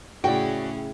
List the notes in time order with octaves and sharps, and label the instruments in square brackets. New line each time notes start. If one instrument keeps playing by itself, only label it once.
[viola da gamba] A2 C#4 G#4 [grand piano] C#3 E4 [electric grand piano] F#4 D5 [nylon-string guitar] G5